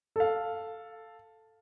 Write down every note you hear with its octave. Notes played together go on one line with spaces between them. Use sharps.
A4 F5